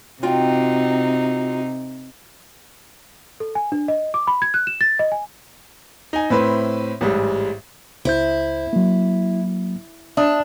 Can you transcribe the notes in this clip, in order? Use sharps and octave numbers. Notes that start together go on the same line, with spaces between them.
C3 D#4 F4 F#4 G5
A4
G#5
D4
D#5
D6
B5
G#6
F#6
E7
A6
D#5
G#5
D#4 G#5
A2 C4 E4 B4 C6
A1 G#2 G3 G#3
C#2 E4 C5 G6
F#3 A#3
D4 E5 D#6